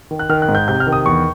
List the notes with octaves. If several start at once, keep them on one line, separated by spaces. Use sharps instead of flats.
D#3
F#6
D#3 F6
F#6
G#2
G6
C3 G6
F6
D#3
D#6
E2 C#6